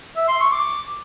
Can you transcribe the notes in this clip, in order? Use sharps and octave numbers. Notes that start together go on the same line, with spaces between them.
E5
C6
C#6
D6